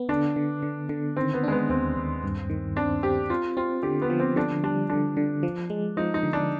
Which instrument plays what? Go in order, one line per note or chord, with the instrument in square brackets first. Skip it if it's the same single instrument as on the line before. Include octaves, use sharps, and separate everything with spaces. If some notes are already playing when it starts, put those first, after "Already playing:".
Already playing: [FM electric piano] B3
[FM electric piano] D3 [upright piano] D4
[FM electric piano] D3
D3
D3
[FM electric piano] D#3 [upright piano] C4
[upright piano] B3
[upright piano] G#3 [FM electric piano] D4
[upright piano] B3
[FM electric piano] D#2 [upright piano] C4
[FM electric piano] D#2
G2
D#3
[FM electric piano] C4 [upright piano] D4
[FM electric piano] C4 [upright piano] G4
[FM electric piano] C4 [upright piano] F4
[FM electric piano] C4 [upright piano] F4
[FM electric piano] D3 [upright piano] G4
[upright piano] B3
[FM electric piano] F3
[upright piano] C4
[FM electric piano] D3 [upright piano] D4
[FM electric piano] G3 [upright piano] D4
[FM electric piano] D3 [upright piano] D4
[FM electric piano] D3
F3
G#3
[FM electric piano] F3 [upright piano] D#4
[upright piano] D#4
[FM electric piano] D3
[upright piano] D4